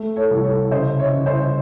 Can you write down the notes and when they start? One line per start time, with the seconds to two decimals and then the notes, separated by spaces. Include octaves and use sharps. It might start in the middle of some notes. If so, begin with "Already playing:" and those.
Already playing: A3
0.16 A4 C#5
0.30 C2
0.44 A4 C#5
0.71 C#3 C5 D#5
0.98 C#5 E5
1.13 C#3
1.26 C5 D#5